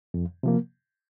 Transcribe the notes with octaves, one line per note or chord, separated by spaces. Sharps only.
F2
C3 F3 A#3